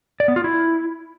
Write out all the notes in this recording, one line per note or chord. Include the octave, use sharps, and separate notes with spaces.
D5
B3
F4
E4